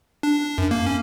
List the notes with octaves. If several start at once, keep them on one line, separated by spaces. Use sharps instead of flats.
D4
F#2
A#3
C#4